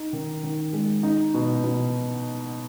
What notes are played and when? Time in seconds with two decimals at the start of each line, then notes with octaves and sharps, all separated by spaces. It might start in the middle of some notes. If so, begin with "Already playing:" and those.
Already playing: D#4
0.13 D#3
0.43 D#3
0.73 G#3
1.03 D#4
1.34 B2
1.64 B2